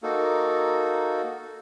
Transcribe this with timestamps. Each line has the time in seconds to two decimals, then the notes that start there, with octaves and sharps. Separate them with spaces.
0.03 A#3 D#4 F#4 A4